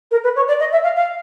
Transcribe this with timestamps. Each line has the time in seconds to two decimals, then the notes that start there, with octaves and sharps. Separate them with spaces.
0.11 A#4
0.23 B4
0.36 C#5
0.47 D5
0.59 D#5
0.72 E5
0.83 F5
0.96 F5